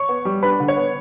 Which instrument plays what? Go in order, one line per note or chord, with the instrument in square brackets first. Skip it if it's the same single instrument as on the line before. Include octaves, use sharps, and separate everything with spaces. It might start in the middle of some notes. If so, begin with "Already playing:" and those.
Already playing: [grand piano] C#5 C#6
B3
G3
D4 B4 B5
D3
C#5
B3